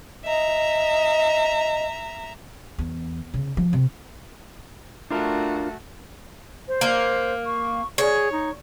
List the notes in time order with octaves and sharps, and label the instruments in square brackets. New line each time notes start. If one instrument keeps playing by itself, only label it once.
[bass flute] D#5 [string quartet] E5 A#5
[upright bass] E2
C#3
F3
C3
[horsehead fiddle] A3 F#4 [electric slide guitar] D4 F4 A#4
[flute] C5
[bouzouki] A#3
[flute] C#6
[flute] G#4 [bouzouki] C#5
[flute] D#4